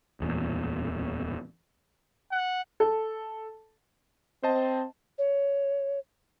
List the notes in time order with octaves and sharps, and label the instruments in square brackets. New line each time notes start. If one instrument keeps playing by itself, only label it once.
[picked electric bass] D1 E2 A#2
[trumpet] F#5
[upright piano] A4
[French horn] C4 [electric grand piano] C5 D#5 A5
[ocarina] C#5